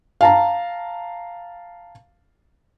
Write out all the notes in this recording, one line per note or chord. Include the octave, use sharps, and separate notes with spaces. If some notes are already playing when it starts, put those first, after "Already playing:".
F5 A5 A#5